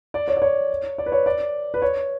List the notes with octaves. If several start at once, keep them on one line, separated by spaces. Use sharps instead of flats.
D5
C#5
D5
C#5
D5
B4
C#5
D5
B4
C#5